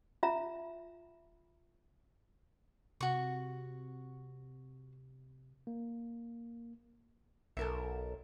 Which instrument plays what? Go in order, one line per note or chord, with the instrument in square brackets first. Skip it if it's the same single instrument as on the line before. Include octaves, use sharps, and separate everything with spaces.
[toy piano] F4 E5 A#5
[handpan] C3 [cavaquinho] F#4 C#6
[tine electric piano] A#3
[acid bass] B1 [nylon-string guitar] A4 A#4 E5